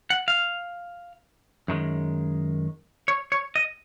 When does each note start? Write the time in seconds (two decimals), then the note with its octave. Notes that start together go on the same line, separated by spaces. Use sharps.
0.10 F#5
0.28 F5
1.68 F#2 D#3 G#3
3.08 C#5
3.32 C#5
3.56 D#5